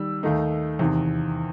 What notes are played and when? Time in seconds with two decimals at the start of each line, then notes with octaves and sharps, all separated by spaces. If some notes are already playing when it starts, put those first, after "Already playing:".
Already playing: D#3 G3 E6
0.23 D#2 D#3 A3 D#4
0.79 E2 C3 D#3